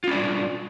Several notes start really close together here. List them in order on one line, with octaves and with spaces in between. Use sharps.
F4 C#4 D4 G3